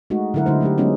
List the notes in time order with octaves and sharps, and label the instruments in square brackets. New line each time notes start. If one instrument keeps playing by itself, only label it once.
[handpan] G#3 A3 D#4 F#4
D3 F#3 E4 A#4 F#5
D3 G#3 A3 D#4 E4 C5
F#3 A3 D4 G4
F#3 G#3 A3 B3 C#4 D#4